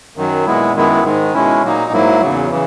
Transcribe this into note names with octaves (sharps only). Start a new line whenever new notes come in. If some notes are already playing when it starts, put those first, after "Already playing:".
F#2 D#3 F#3
A#2 G#3 B3 E4
F#2 D#3 G#3 B3 E4
G#2 D#3 G#3
B2 G#3 C#4 E4
A#2 F#3 A#3 D#4
G#2 F#3 A#3 E4
E2 C#3 F#3
C#3 E3